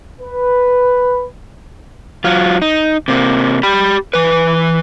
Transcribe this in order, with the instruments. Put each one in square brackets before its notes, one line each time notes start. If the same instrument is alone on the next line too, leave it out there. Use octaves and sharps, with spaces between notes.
[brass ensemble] B4
[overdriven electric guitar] F#3 F4
D#4
C3 A#3
G4 B5
E3 B4